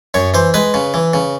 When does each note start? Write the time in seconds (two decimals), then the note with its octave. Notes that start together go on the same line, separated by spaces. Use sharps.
0.14 F#2 C#5
0.34 E3 C5
0.54 G#3 B4
0.74 C#3
0.94 E3
1.14 C#3